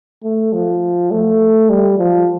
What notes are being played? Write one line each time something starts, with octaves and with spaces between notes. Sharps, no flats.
A3
F3
A3
G3
F3